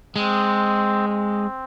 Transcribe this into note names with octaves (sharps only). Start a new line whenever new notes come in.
G#3 C4
C4